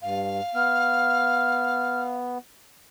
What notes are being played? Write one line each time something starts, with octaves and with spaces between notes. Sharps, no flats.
G2 F5
B3 F6